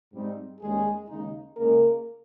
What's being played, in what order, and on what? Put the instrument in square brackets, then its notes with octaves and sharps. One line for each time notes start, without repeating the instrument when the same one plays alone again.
[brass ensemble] G#2 G3 C4 D#4
D#2 D#3 G3 G#3 C#4 G#4
D#2 C#3 G#3 D#4
C#2 C#3 G#3 A#3 C#4 A#4